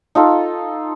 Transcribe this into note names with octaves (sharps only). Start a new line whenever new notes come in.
D#4 F4 A4